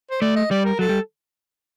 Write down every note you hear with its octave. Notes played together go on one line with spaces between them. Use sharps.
C5
A3 D5
D#5
G3 D5
A#4
F#3 A4
G3